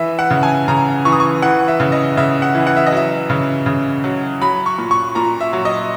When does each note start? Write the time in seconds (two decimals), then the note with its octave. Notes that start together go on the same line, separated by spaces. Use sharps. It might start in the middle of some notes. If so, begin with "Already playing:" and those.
Already playing: E3 E5
0.19 F#5
0.31 C#3
0.43 G#5
0.68 C#3 A#5
1.05 E3 C#6
1.12 D#6
1.20 C#6
1.42 E3 F#5
1.68 E5
1.80 C#3
1.92 D#5
2.17 C#3 E5
2.42 F#5
2.55 E3
2.67 F#5
2.77 E5
2.86 D#5
2.92 F#3 E5
3.30 C#3
3.66 C#3
4.04 F#3
4.41 F#3 B5
4.66 C#6
4.78 A#2
4.91 C#6
5.15 A#2 A#5
5.41 E5
5.53 F#3
5.65 D#5